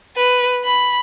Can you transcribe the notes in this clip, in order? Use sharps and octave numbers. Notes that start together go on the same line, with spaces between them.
B4
B5